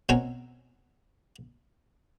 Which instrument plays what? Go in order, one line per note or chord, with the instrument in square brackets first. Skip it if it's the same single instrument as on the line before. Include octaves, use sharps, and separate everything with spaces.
[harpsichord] B2 C4 C#4 A#4 G#5